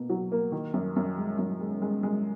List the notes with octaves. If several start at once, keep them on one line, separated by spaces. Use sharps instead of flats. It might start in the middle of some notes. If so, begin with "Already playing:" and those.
Already playing: B2 A#3
F#3
A#3
D#3
F#2
F#2
G#3
F#2
G#3
G#3
G#3